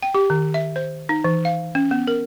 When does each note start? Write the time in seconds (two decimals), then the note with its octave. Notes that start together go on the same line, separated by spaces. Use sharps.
0.03 G5
0.15 G4
0.30 D#3
0.54 E5
0.76 C5
1.09 D#4
1.24 E3
1.45 F5
1.75 C#4
1.91 B3
2.07 A#4